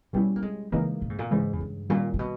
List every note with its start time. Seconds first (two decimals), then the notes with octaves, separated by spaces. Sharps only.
0.13 B2 G3 B3 C#4 E4
0.36 A#3
0.42 G#3
0.72 C#3 E3 G#3 A#3 D#4
1.02 A#2
1.10 G#2
1.19 A#2
1.31 G#2 C#3 E3 G#3
1.53 E2
1.60 G2
1.90 A#2 D#3 G3 A#3 C#4
2.14 A#2
2.19 B2